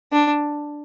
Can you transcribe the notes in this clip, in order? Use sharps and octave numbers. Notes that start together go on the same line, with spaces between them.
D4